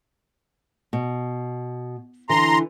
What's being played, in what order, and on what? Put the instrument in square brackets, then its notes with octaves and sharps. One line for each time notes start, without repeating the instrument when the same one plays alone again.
[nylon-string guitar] B2
[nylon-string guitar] D3 E3 [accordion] A#5 C6